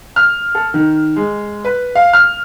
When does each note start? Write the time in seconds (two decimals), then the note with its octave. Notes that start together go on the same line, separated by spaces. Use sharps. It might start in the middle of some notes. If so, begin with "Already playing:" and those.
0.16 F6
0.55 A4
0.74 D#3
1.16 G#3
1.65 B4
1.95 F5
2.13 F6